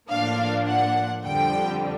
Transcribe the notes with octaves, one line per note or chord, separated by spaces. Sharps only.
A2 F3 A#3 D4 F5
F#5
F2 D3 G3 G5